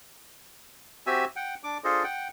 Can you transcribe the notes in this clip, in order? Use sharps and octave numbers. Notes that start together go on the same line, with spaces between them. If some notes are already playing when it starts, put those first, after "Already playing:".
C4 F#4 G4 E5 G#5 E6
F#5 G5
D4 D6
D4 F4 G#4 A4 C5 D#5
F#5 G5